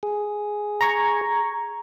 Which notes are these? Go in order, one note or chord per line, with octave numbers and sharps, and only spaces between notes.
G#4
A#5 C#6 G#6